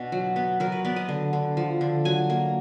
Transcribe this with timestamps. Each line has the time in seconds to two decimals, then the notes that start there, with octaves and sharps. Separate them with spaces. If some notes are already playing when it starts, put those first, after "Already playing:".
Already playing: B2 D4 F#4
0.12 F#3
0.36 B3
0.60 F#3 A#4
0.72 B4
0.84 B3 D5
0.96 D#5
1.09 D3
1.33 D3
1.57 F3
1.81 D3
2.05 F#3 G#5
2.30 A#3